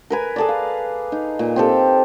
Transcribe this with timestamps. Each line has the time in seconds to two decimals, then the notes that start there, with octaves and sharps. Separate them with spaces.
0.10 A#4 B4 G#5
0.36 G#4 A4 D5
0.49 F5
1.12 D#4
1.39 A#2
1.56 C4 G4 A4